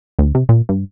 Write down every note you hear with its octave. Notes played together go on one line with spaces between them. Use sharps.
D2
C3
A#2
G2